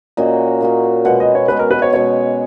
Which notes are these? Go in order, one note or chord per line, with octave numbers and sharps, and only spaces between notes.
A#2 A#3 C#4 F#4 D#5
A#2 A#3 C#4 F#4
B2 G#3 B3 F#5
D#5
C#5
B2 G#3 B3 B4
A#4
B4
C#5
B2 G#3 C#4 C#5